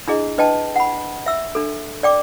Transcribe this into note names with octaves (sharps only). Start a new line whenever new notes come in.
D4 E4 G#4 D#5
D4 B4 D#5 G5 A5
F#5 B5
E5 E6
D4 A4
D5 G5 D6